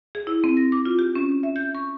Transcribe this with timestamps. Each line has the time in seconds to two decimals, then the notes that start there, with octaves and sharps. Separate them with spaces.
0.15 G#4
0.27 E4
0.44 C4
0.57 A#6
0.72 D6
0.85 F4
0.99 G4
1.15 C#4
1.43 E5
1.56 G6
1.75 C#6